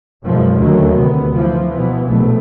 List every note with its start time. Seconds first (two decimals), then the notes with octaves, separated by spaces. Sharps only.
0.24 F#2 B2 E3 F3 G#3
0.56 D#2 D3 D#3 F#3 A3
0.90 D2 C3 B3
1.34 E3 F3
1.70 B2 E3 F3 B3
2.06 A#1 B2 A3 B3